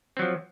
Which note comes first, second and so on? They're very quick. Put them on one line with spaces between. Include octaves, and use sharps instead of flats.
C4 F#3 F3